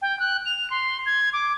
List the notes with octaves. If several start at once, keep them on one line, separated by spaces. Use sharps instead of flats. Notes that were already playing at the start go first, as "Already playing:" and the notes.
G5
F#6
F7
C6
G#6
D6